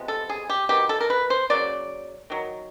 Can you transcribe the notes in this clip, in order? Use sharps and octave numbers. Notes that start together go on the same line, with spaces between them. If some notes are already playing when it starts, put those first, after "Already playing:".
Already playing: C3 F3 G#3 B3
A4
G#4
G4
D#3 F#3 B3 G4
A4
A#4
B4
C5
C#3 F#3 A#3 D5
D#3 F#3